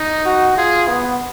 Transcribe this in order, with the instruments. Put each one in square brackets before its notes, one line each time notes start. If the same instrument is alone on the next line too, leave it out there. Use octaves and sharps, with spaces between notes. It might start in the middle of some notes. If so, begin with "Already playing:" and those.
Already playing: [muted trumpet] D#4
[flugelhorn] F#4
[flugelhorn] F4 [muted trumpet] G#4
[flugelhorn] B3